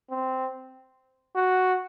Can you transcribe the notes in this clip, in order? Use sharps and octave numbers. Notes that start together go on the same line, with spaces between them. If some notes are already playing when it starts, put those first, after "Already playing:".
C4
F#4